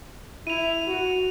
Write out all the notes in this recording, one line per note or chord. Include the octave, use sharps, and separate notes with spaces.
E4 D#7 F7
F#4